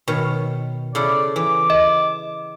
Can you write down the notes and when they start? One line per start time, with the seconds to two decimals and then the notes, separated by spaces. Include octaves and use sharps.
0.08 B2 D#3 C#5
0.95 C#3 E4 A4 D5
1.36 E3 D6
1.70 D#5